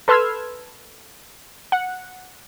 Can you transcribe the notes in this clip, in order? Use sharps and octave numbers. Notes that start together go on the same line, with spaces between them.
A4 B4 C6 E6 F6 G#6
F#5